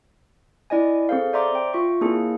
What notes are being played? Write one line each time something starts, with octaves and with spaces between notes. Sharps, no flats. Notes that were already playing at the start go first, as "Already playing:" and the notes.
E4 D5 D#5 G#5
C4 G#4 A4 C5 F5
C5 D5 E5 A#5 C6 D6
G5
F4 E5 C#6
A#3 C4 D4 E4 G#4